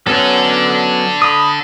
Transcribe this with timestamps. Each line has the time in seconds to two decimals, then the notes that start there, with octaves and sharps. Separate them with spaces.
0.07 F#3 B3 C#4 D4 A4
1.22 B5 D#6